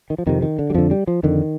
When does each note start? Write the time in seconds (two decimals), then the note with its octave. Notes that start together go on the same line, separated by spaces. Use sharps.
0.10 D#3
0.18 F3
0.26 F2 C3 D#3
0.42 D#3
0.59 D3
0.70 G3
0.74 F2 D3 F3
0.91 G3
1.07 F3
1.23 F2 D3 D#3